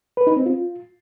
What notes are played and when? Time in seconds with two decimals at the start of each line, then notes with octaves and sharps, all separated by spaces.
0.17 B4
0.27 D#4
0.36 C4
0.46 F4